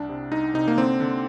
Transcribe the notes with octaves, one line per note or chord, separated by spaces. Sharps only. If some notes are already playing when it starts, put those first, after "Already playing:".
Already playing: C2 D4
C3
C2 D#4
C3 D#4
A#3
D3 C4
D3